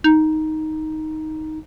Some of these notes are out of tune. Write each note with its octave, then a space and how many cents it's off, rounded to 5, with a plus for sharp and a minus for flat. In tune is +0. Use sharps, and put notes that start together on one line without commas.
D#4 +5